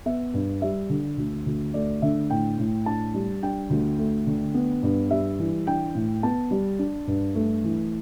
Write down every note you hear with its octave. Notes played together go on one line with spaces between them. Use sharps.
B3 E5
G2
G3 E5
D3
D2
D2
A3 D5
D3 E5
A2 G5
A2
D4 A5
G3
D4 G5
D2
A3
D3
B3
G2
G3 E5
E3
D4 G5
A2
B3 A5
G3
D4
G2
A3
E3